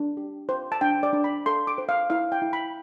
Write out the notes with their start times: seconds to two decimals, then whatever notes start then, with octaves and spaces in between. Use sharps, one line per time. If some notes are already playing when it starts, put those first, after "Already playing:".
Already playing: D4
0.17 G4
0.49 C5
0.72 A5
0.81 D4 G5
1.03 D5
1.13 D4
1.24 B5
1.46 A4 C6
1.67 D6
1.78 C5
1.89 F5
2.10 E4 F5
2.32 G5
2.42 E4
2.53 B5